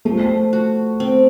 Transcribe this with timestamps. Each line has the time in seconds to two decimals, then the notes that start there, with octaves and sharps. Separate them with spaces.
0.05 F3 A3
0.53 F#4
1.00 C4